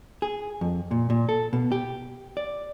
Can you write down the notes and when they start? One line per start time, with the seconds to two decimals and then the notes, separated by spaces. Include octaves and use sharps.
0.22 G#4
0.61 F2
0.91 A#2
1.10 A#2
1.29 A4
1.53 B2
1.72 G4
2.37 D5